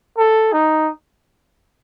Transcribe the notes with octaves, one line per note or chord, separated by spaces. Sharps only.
A4
D#4